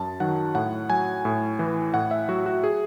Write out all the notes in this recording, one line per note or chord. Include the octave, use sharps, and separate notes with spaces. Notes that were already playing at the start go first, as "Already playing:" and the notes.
Already playing: F#2 A5
D#3 F#3 F#5
A2 F#5
F#3 G#5
A2
E3
A2 F#5
E5
F#3 F#4
F#4
G#4